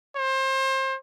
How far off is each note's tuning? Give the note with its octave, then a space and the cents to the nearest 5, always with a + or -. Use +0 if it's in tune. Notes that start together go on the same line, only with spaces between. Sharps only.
C5 +30